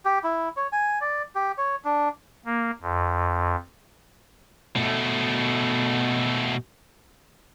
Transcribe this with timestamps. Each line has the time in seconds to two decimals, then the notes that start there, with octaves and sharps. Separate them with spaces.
0.05 G4
0.24 E4
0.57 C#5
0.73 G#5
1.01 D5
1.35 G4
1.58 C#5
1.85 D4
2.46 A#3
2.82 F2
4.76 B2 A3